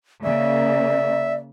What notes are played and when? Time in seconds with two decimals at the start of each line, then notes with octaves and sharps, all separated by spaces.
0.24 C#3 A#3 D5 E5